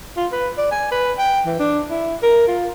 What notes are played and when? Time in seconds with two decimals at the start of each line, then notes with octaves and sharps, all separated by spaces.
0.16 F4
0.32 B4
0.58 D5
0.71 G#5
0.91 B4
1.18 G5
1.46 E3
1.59 D4
1.90 E4
2.23 A#4
2.47 F4